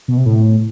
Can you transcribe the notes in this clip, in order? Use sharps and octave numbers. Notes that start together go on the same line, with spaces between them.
B2
C3
A2